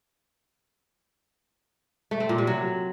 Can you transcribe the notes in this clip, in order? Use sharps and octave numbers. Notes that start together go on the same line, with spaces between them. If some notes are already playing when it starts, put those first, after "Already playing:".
A3
C4
A#2
C3
F#3